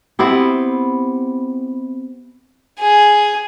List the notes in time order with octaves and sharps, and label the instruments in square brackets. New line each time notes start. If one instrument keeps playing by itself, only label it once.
[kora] B3 C4 E4 G4
[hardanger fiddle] G#4